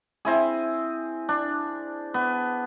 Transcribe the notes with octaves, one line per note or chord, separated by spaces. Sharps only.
C4 E4 G#4
D4
B3